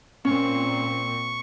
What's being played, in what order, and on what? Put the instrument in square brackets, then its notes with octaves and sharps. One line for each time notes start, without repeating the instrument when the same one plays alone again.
[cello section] A#2 C4 [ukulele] C#4 [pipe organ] C#6